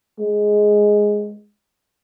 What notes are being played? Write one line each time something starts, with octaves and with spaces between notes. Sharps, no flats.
G#3